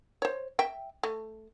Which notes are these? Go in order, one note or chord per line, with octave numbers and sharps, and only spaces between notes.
C5 C#5
E5 G5
A3